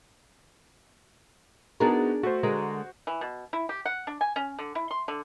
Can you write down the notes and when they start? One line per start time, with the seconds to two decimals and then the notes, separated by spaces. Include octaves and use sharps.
1.80 B3 D4 D#4 F#4 G#4 A#4
2.23 A3 F#4 C5
2.43 D3 G#3 A#4
3.07 E3
3.21 B2
3.53 E4
3.69 G4
3.85 F#5
4.07 D4
4.21 G#5
4.36 C#4
4.59 D3
4.75 E4
4.91 C6
5.08 D3